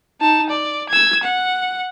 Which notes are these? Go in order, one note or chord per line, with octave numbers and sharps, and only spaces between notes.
D#4 A5
D5
E6 G#6
F#5